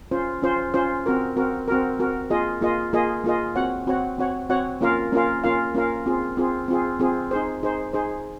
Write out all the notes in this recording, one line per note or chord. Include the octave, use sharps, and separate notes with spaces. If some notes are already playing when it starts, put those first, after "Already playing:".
C#4 F4 C5
C#4 F4 C5
C#4 F4 C5
C4 F#4 A#4
C4 F#4 A#4
C4 F#4 A#4
C4 F#4 A#4
A#3 F4 G#4 D#5
A#3 F4 G#4 D#5
A#3 F4 G#4 D#5
A#3 F4 G#4 D#5
C4 F#4 C#5 F#5
C4 F#4 C#5 F#5
C4 F#4 C#5 F#5
C4 F#4 C#5 F#5
A#3 C#4 F4 A#4 F5
A#3 C#4 F4 A#4 F5
A#3 C#4 F4 A#4 F5
A#3 C#4 F4 A#4 F5
C4 F4 G#4
C4 F4 G#4
C4 F4 G#4
C4 F4 G#4
D#4 G#4 C5
D#4 G#4 C5
D#4 G#4 C5